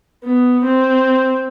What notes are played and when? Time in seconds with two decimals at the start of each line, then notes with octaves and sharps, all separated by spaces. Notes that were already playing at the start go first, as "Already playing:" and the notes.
0.24 B3
0.64 C4